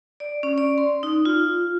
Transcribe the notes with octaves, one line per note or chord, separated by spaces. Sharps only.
D5
C#4
D5
C6
D#4
F4